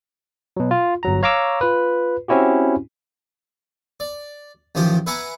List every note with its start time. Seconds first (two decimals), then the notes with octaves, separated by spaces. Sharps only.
0.57 B2 F#3
0.71 F4
1.03 G1 F#3 A#5
1.23 C#5 F5 A#5 C#6 D6 E6
1.61 F4 B4
2.28 C4 C#4 E4 F#4 G4
4.00 D5
4.75 A1 D#3 F3 G4 C5
5.07 B4 E5 F#5 G#5 A#5 D6